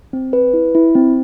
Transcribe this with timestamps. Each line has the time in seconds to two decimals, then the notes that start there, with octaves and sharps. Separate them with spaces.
0.13 C4
0.33 B4
0.53 E4
0.75 E4
0.95 C4